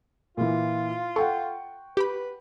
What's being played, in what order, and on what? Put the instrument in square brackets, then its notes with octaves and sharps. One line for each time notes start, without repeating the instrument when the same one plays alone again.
[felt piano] A#2 E3 [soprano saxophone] F4
[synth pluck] A4 [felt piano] F#5 G5 C#6
[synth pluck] G4 B5 [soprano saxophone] B4